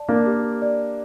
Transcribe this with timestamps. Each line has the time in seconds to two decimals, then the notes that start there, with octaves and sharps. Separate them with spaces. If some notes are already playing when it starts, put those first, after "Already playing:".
Already playing: D5 A5
0.08 A#3 D4
0.26 G4
0.62 D5